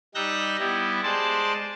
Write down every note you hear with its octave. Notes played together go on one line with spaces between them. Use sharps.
G3 D#4 E6 F#6 G6 A#6
G3 B3 E4 G4
G#3 C5 D5 A5